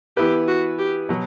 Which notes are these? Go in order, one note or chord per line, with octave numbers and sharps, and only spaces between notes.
E3 B3 E4 G4 B4
F#4
G4
B2 F#3